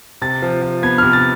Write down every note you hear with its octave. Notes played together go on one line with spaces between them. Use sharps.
C3 A6
F3
F3
B3 G#6
C3 F6
A6